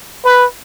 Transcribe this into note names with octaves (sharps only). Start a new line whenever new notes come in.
B4